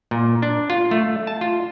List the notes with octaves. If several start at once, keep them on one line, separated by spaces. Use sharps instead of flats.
A#2
D4
F4
A3
A5
F4